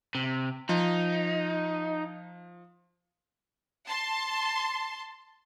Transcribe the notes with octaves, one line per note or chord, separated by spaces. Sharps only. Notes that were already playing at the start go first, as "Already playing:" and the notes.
C3
F3 D#4
A5 C6